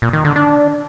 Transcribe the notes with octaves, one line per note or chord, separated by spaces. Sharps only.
A#2
D#3
D3
D4